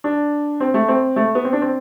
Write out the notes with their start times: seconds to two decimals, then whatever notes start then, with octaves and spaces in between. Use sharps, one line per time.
0.04 D4
0.60 C4
0.74 A3
0.88 C4
1.16 A3
1.35 B3
1.45 C4
1.53 D4
1.62 C4